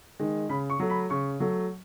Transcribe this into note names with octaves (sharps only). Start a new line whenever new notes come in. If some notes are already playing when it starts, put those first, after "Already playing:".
D#3 G#3
C#3 B5
C#6
F#3 A3
B5
C#3 C#6
F#3 A3